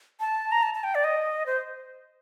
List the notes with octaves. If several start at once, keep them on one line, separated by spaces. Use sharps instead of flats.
A5
A#5
A5
A5
G5
D5
D#5
C5